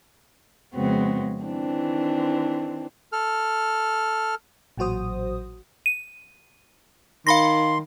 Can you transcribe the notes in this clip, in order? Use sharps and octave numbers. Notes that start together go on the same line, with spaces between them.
F2 C#3 G#3 B3 C4 F#4
D#3 E3 C4 D4
A4 F6
A1 A#2 F#3 F#4 C5 D#6
D#7
D#3 F5 B5 C6 A#6